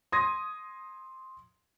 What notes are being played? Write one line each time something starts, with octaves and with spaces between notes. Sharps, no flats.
C6 D#6 G#6 A#6